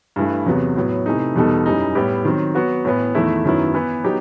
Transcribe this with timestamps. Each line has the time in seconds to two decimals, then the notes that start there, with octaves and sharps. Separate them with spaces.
0.16 G2 E3 A3
0.46 E2 C3 F#3 B3
0.76 A2 F#3 B3
1.06 C3 E3 A3 D#4
1.36 E2 B2 G3 D#4 A4
1.66 F#2 E3 G3 D#4
1.95 A2 G3 B3 E4 G4
2.25 D#3 F#3 C4
2.55 F#3 B3 F#4
2.85 A2 E3 B3
3.15 E2 D#3 A3 E4
3.44 F#2 D#3 F#3 B3 E4
3.74 E3 B3 E4
4.04 F#3 B3 D#4 G4